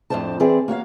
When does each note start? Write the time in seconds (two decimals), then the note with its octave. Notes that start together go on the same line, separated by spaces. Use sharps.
0.10 F2 A2 D4 C5 D5 A5
0.40 E3 C4 G#4 D5
0.68 A#3 F#4 C#5 F5